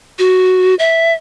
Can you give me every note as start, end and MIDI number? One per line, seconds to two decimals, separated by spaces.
0.19 0.75 66
0.79 1.13 76